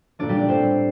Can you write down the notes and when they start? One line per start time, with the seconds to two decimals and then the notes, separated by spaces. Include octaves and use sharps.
0.19 A#2 A3 D4 D5
0.29 G3 G4
0.39 D4 D5
0.48 A2 A3 C4 C5